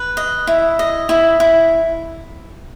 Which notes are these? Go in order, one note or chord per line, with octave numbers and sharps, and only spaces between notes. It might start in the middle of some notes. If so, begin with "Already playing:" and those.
Already playing: B4
D#5
E4
D#5
E4
E4